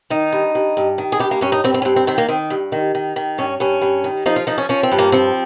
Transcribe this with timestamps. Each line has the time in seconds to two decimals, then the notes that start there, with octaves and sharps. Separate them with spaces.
0.10 D#3 D#4
0.32 G2
0.55 G2
0.77 G2
0.98 D#3
1.12 G#4
1.19 G2 G4
1.31 A#3
1.41 G2 C#4
1.52 D#4
1.64 G2 C4
1.74 C4
1.82 C#4
1.85 G2 C4
1.96 C4
2.07 D#3 C4
2.18 A#3
2.28 D#3 C4
2.50 G2
2.72 D#3
2.95 D#3
3.16 D#3
3.38 G2 C#4
3.60 G2 C#4
3.81 G2
4.04 D#3
4.26 F3 D#4
4.36 F4
4.47 F3 D#4
4.58 C#4
4.69 F3 C#4
4.83 C4
4.92 G2
4.98 A#3
5.12 F3 C4